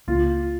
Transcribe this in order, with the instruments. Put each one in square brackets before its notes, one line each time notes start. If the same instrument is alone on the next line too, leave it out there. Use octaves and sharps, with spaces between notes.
[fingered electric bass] C#2 C#3 A#3 C#4 [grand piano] F4